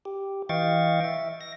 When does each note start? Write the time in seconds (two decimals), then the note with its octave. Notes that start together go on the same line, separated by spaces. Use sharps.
0.05 G4
0.49 E3 D#5 F5 G5 C#6 A6
1.04 E5
1.41 A#6